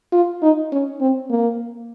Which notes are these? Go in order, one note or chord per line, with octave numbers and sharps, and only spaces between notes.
F4
D#4
C#4
C4
A#3